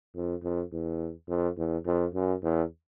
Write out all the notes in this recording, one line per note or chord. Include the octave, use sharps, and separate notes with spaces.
F2
F2
E2
F2
E2
F2
F#2
E2